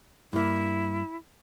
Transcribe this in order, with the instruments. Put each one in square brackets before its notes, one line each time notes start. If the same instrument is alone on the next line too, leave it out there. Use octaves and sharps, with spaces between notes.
[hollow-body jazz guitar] G2 A#3 [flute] E4